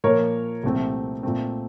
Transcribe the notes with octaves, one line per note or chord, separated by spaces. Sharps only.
A#2 F3 A#3 A#4 C#5
C2 A#2 F3 A3 C4
A#2 A3 C4